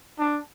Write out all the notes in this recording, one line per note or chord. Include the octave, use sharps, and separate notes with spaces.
D4